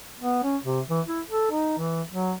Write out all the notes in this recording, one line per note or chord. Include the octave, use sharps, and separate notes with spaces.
B3
C#4
C3
E3
E4
A4
D#4
E3
F#3